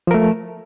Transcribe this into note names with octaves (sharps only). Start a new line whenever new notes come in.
F3 A3 A#4